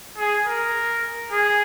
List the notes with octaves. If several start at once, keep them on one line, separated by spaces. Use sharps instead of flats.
G#4
A#4
G#4